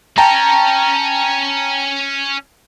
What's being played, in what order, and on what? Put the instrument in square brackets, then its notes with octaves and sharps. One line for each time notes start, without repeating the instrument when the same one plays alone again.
[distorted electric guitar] C#4 C#5 [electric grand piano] G5 A5 A#5